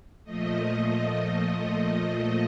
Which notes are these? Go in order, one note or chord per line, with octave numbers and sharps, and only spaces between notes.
A#2 F3 A3 D#5
D#5